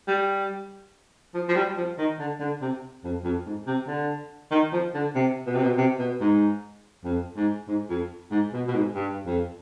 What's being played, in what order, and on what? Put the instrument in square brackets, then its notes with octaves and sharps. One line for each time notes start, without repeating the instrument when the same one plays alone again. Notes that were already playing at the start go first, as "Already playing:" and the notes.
[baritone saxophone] G3
F3
F3
G3
F3
D#3
D3
D3
C3
F2
F2
G#2
C3
D3
D#3
F3
D3
C3
B2
C3
B2
C3
B2
G#2
F2
G#2
G#2
F2
G#2
B2
B2
G#2
G2
F2